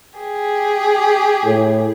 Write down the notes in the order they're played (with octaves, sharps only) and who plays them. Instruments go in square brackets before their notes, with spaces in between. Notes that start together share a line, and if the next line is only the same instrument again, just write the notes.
[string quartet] G4 G#4
[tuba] A2